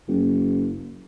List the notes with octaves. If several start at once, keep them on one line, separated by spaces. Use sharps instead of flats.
F#1